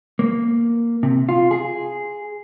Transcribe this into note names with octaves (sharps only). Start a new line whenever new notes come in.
A#3
C3
F4
G#4